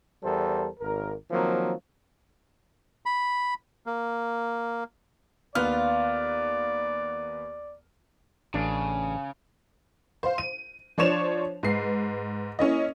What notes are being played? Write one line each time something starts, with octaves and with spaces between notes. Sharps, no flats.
E2 G3 A4 A#4 C5
G#1 A#4
D#3 F3 F#3 A#3 C4
B5
A#3
D#2 B3 F4 D5 F6
A1 C#3 D4
C5 F5
D#7
F3 D4 C5 C#5 E7 F7
G#2 B4 C7
A#3 C#4 E4 D#5